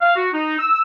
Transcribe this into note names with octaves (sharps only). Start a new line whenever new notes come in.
F5
F#4
D#4
E6